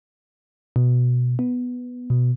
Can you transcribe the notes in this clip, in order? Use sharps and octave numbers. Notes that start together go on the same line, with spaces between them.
B2
B3
B2